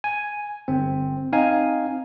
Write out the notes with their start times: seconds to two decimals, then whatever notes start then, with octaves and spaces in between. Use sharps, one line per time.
0.04 G#5
0.68 G1 C4
1.32 C4 D#4 F5 G#5